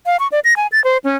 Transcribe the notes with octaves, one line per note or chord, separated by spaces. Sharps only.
F5
C#6
D5
A#6
G#5
A6
C5
C#4